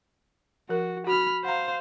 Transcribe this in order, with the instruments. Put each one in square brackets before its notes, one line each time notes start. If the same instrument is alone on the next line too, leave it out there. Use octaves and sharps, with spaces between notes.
[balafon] F3 A#4 [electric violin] F#4
[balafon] F#4 [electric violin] B5 F6
[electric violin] C5 F5 [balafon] F#5 A#5